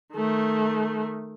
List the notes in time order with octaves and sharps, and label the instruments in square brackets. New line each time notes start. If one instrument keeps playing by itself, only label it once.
[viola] D#3 A3